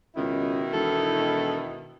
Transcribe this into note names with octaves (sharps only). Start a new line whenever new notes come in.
C#2 B2 D#3 E4
E1 A4